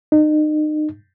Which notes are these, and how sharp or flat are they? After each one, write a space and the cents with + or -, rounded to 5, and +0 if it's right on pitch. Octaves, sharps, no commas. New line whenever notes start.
D#4 -35